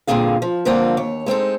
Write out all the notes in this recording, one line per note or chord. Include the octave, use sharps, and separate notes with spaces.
G2 A#2 D3 C4 G#4 F5
F3
G2 D3 F3 A#3 C4 F4
D#2 C#5
G#3 C4 D#4 A4